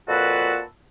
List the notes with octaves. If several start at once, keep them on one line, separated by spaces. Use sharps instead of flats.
F2 A#2 F#4 B4 A5 E6